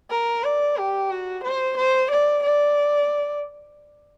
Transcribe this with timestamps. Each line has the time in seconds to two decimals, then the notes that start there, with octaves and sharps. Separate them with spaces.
0.10 A#4
0.44 D5
0.77 G4
1.10 F#4
1.43 C5
1.77 C5
2.10 D5
2.43 D5